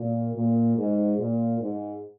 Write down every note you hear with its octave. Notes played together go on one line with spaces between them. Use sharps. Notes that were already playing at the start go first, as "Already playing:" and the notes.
Already playing: A#2
A#2
G#2
A#2
G#2